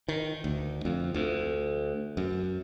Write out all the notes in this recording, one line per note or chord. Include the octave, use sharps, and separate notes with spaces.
D#3
D2
F2
D2
F#2